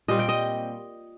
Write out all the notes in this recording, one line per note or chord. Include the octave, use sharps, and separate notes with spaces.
A#2 G3 C4 D#5
G5
D#5